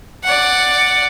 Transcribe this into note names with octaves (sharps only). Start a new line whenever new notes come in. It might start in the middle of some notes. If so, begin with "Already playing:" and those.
D5 F#5